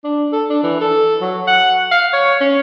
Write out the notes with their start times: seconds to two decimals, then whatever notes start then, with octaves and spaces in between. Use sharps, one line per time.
0.04 D4
0.32 A4
0.50 D4
0.63 E3
0.81 A4
1.21 F#3
1.47 F#5
1.91 F5
2.13 C#5
2.41 C#4